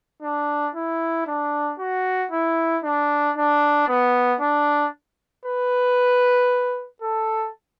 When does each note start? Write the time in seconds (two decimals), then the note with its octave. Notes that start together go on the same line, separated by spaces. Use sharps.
0.22 D4
0.75 E4
1.27 D4
1.79 F#4
2.31 E4
2.84 D4
3.36 D4
3.88 B3
4.40 D4
5.45 B4
7.02 A4